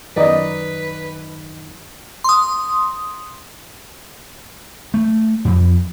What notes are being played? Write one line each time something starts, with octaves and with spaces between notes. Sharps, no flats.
F#2 D#3 D#4 B4 D5 D#5
C6 D#6
A3
F2